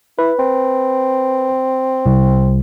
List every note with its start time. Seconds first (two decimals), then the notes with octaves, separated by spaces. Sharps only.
0.19 E4 B4
0.39 C4
2.06 C2